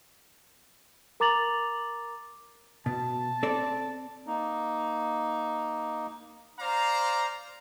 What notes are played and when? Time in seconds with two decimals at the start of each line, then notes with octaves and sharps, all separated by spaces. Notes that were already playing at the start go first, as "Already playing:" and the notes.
1.20 A#4 A#5 D6 A6 F7 F#7
2.86 B2 A5
3.43 C4 A4 D5
4.27 A#3 D#4
6.60 C5 D5 F5 A#5